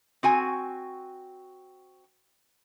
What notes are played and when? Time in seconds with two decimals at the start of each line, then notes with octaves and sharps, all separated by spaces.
0.23 C4 F#4 G#5